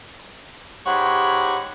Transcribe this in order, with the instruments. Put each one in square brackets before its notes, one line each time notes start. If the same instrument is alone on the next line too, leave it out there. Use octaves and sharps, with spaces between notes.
[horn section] G#2 G4 C#5 F#5 B5